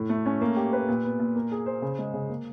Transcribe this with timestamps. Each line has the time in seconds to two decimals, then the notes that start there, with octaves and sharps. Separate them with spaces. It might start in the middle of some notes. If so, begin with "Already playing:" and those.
Already playing: A2
0.09 A3
0.26 C#4
0.41 A#3
0.57 G4
0.73 B4
0.88 A#2
1.04 B3
1.19 A#2
1.35 A#3
1.52 G#4
1.66 C5
1.82 C#3
1.98 G#3
2.14 C#3
2.29 A#3